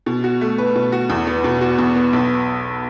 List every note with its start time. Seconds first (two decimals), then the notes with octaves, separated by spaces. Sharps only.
0.06 B2
0.24 F#4
0.41 A3
0.58 B4
0.76 B2
0.92 F#4
1.10 E2
1.27 B3
1.44 B2
1.61 F#4
1.79 E2
1.96 B3
2.13 B1